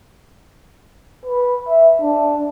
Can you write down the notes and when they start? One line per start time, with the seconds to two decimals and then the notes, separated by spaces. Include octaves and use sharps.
1.25 B4
1.68 E5
2.02 D4